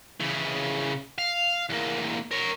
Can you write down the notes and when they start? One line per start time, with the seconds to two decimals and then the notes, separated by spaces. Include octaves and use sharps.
0.20 C#3 E3
1.18 F5
1.69 E2 A#3
2.31 A#4 C#5